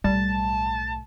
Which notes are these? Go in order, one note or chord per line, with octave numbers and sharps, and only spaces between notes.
B1 A2 G3 A5